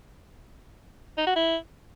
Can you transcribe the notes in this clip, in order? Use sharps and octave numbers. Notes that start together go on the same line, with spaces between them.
D#4
F#4
E4